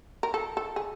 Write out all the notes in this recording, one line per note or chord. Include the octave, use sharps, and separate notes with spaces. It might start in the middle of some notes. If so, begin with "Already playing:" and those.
A#4
A4
A4
G#4